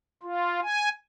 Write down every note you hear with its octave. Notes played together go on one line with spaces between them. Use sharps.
F4
G#5